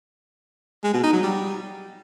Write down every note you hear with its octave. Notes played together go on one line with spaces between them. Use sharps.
G#3
B2
D#4
F#3
G3